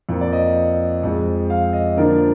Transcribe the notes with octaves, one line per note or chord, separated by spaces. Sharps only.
F2 F3 A#3
D5
D#5
F2 F3 G#3
F5
D#5
D3 F3 A#3 D4 A#4